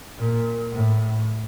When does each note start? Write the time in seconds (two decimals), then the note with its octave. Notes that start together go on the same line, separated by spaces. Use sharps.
0.18 A#2
0.72 A2